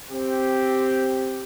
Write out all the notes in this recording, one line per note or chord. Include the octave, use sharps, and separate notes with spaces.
C4 G4